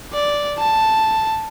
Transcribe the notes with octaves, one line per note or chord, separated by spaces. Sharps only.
D5
A5